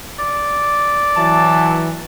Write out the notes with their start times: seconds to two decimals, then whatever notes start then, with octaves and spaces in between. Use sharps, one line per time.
0.19 D5
1.16 E3 F#3 A5